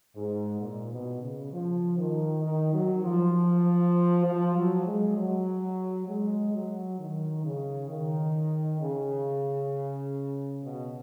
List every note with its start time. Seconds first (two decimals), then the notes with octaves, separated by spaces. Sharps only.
0.16 G#2
0.60 A#2
0.92 B2
1.22 C#3
1.52 F3
1.98 D#3
2.43 D#3
2.73 F#3
3.03 F3
4.25 F3
4.55 F#3
4.86 G#3
5.17 F#3
6.08 G#3
6.54 F#3
6.99 D#3
7.45 C#3
7.89 D#3
8.81 C#3
10.63 B2